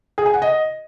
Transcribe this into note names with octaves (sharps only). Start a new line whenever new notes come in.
G#4
G#5
F#5
D#5